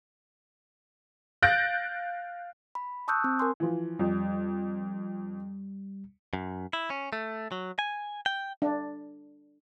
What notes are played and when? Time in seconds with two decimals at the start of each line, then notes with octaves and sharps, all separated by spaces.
1.42 F5 F#6 G6 A6 A#6 D7
2.75 B5
3.08 A5 C#6 D#6 E6 F#6 G6
3.24 C4
3.39 A#4 G#5 C6
3.60 E3 F3
3.99 F2 G3
6.33 F#2
6.73 E4
6.90 C#4
7.13 A3
7.52 F#3
7.79 G#5
8.26 G5
8.62 D4